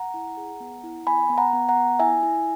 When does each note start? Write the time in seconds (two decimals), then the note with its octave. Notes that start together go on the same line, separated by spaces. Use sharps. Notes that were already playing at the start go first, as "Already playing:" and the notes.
Already playing: F#5 A#5
0.14 E4
0.37 G#4
0.60 B3
0.84 E4
1.07 B3 G#5 B5
1.30 B3
1.38 F#5 A#5
1.53 B3
1.69 F#5 A#5
1.77 B3
1.99 E4 E5 G#5
2.23 E4